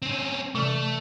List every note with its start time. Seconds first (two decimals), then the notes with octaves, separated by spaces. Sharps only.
0.02 C4 C#4
0.55 C3 E3 A3